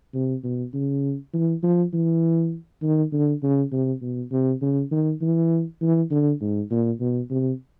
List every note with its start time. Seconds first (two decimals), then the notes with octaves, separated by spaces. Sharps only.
0.14 C3
0.44 B2
0.73 C#3
1.33 E3
1.63 F3
1.93 E3
2.83 D#3
3.12 D3
3.43 C#3
3.72 C3
4.02 B2
4.32 C3
4.62 C#3
4.91 D#3
5.21 E3
5.81 E3
6.11 D3
6.41 G#2
6.71 A#2
7.00 B2
7.30 C3